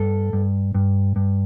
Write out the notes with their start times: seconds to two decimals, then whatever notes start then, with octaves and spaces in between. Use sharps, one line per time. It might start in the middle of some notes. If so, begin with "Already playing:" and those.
Already playing: G2 A4
0.33 G2
0.75 G2
1.16 G2